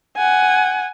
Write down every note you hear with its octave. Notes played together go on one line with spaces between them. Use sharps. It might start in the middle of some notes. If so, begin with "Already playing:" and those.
F#5 G#5